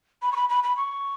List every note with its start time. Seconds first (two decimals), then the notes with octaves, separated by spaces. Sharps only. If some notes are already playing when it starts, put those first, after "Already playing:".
0.22 B5
0.32 C#6
0.36 B5
0.49 B5
0.64 B5
0.77 C#6